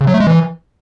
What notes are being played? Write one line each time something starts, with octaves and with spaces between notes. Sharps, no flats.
C#3
F#3
A3
G#3
E3